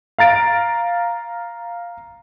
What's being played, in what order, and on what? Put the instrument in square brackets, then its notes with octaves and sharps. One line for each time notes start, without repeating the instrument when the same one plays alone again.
[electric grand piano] F5 A#5 A6 D7